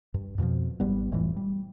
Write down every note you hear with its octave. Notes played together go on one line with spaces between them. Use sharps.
G2
F2 B2 E3 F3
G#1 G3 B3
F1 A2 E3
G3